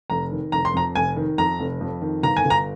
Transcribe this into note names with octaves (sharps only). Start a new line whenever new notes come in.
F1 A#5
D#3
F1 A#5
C6
F2 A#5
F1 G#5
D#3
F2 A#5
F1
F2
D#3
G1 A#5
G#5
G1
A#5